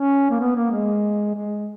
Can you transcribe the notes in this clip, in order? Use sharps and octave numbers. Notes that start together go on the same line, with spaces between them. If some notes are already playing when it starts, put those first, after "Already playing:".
Already playing: C#4
A#3
B3
A#3
G#3
G#3